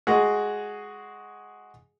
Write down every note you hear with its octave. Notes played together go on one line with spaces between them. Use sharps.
G#3 F#4 G#4